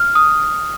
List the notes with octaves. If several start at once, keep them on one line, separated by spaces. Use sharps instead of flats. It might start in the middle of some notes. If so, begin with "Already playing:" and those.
Already playing: F6
D#6